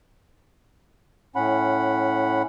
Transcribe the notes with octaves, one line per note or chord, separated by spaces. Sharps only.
A2 C#4 F#5 B5